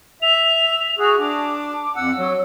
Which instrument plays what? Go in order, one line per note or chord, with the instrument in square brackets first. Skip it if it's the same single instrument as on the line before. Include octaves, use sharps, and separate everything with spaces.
[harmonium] E5 [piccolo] F7
[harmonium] F#4 G#4
[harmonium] D4 [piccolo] D6
[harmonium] F2 F#5 [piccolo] E6
[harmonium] F#3